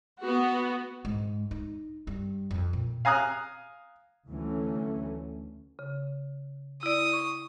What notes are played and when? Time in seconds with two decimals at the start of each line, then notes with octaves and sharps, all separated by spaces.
0.21 B3 F#4
1.05 G#2
1.51 D#4
2.07 G2
2.51 F2
2.73 A#2
3.05 F5 G#5 A#5 D#6 F#6
4.27 D2 E3 F#3 A3 C#4
5.79 C#3
6.83 E4 D5 D#6
7.13 C#6